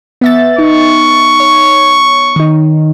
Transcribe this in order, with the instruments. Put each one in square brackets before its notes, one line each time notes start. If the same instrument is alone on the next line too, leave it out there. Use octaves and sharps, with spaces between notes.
[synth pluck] B3 E5 A6
[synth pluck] D#4 [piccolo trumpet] C#6
[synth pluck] C#5
D#3 D#4